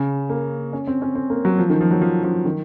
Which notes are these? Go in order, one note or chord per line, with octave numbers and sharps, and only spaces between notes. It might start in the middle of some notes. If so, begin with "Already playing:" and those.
Already playing: C#3
A#3
C#4
C4
C#4
C4
A#3
F#3
F3
D#3
F3
F#3
F3
F3
D#3